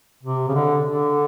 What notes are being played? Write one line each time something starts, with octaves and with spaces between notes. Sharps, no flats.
C3
C#3
D3
D3